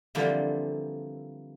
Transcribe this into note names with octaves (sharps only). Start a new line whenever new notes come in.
D3 E3 F3 G3 A#3 C4